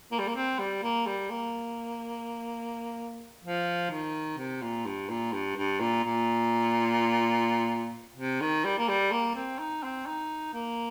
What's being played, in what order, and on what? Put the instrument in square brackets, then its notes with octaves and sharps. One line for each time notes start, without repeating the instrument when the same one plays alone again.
[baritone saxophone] A#3
G3
A#3
C4
G3
A#3
G3
A#3
F3
D#3
C3
A#2
G2
A#2
G2
G2
A#2
A#2
C3
D#3
G3
A#3
G3
A#3
C4
D#4
C4
D#4
A#3